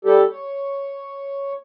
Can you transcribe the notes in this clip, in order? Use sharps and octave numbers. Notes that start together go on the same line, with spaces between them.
G3 G4 A4
C#5